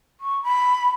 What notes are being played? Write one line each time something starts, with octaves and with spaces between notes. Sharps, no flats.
C#6
B5